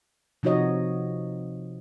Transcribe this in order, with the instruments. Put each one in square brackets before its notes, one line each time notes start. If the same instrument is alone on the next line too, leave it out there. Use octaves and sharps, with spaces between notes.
[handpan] C3 F3 D#4 F#4 C#5 D#5